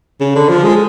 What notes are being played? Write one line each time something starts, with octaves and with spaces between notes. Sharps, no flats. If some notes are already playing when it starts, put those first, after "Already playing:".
C#3
D3
F3
G#3